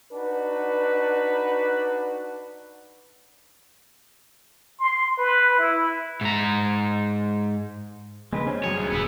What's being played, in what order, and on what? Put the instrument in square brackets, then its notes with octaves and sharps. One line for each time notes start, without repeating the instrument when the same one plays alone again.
[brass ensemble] D4 D#4 F#4 B4
[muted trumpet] C6
B4
E4
[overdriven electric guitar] G#2 A#5
[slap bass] C#3 A#3 [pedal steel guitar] G#3 B4
[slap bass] G3 D4 [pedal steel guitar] C#4 [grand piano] C5
[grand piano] F#2 F#3 [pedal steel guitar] G#4 [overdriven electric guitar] C#5
[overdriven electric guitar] D2
[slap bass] D#1 [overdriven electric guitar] B3 E4